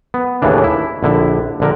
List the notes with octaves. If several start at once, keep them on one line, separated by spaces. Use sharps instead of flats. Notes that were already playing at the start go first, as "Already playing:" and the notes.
B3
D#2 A2 C#3 E3 D4
E4
A#1 D3 E4
A#1 D3 A#4